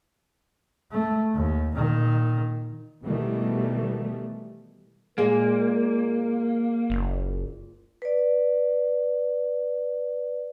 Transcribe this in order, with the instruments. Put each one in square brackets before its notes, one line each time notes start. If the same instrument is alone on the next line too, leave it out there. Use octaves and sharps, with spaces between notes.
[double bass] A3
D#2
A#2 D#3
[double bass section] B2 D#3 E3 G3 A3
[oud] A#2 G#3 [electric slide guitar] A#3 [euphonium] A#4
[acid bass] F#1
[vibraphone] B4 D5